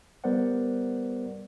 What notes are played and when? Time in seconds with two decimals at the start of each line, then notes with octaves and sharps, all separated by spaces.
0.24 G3 B3 A#4 C5 D5 F#5